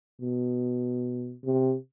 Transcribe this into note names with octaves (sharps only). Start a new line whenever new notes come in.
B2
C3